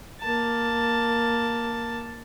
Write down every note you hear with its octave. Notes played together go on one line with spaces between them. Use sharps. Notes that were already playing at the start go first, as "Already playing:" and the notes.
A#3 A5